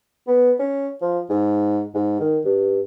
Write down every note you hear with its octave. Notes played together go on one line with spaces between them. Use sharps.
B3
C#4
F3
G#2
G#2
D#3
G2